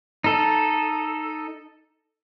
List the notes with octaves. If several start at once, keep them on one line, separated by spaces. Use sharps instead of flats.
D#4 A4